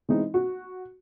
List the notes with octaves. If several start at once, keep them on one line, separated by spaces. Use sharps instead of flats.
E3 G#3 C4 D#4
F#4